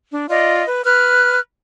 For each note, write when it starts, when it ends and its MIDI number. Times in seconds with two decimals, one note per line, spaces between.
0.13 0.26 62
0.29 0.64 65
0.29 0.64 74
0.29 0.64 75
0.66 0.84 71
0.85 1.39 71
0.85 1.39 89
0.85 1.39 90